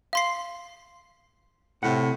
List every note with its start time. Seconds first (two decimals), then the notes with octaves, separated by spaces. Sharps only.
0.13 F5 C6 C7
1.83 A2 C3 F#5